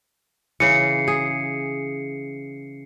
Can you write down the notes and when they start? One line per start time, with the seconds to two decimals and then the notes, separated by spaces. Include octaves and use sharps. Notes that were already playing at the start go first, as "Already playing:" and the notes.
0.60 C#3 E3 C7 C#7
1.08 G#4